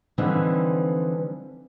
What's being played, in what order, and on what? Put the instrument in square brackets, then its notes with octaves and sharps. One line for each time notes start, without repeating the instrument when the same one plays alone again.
[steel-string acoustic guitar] D3 E3 F3 G3 C4 D#4